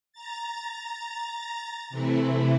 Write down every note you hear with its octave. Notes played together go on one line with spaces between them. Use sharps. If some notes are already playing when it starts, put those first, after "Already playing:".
A#5 A6
C3 E3 A3 E4